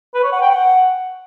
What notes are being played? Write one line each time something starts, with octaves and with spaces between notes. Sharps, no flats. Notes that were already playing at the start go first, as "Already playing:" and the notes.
B4
C#5
F#5
G5
F#5